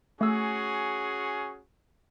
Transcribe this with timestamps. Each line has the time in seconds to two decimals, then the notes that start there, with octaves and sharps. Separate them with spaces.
0.21 A3 C#4 F#4 G#4 E6